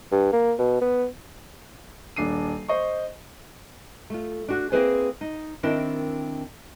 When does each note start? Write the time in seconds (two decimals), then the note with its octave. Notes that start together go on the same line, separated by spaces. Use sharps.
0.12 G2
0.33 A#3
0.59 B2
0.81 B3
2.16 D#1 D4 C7 D#7
2.68 C5 D#5 C#6
4.10 A3 F4
4.48 D4 F#4
4.72 A#3 C4 E4 G#4 B4 C5
5.21 D#4
5.63 D#3 C4 D4 E4 A#4